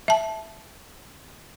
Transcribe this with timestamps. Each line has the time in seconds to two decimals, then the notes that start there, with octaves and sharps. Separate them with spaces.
0.08 E5 A5